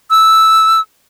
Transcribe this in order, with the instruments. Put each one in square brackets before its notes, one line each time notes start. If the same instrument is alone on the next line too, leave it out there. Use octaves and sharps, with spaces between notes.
[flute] E6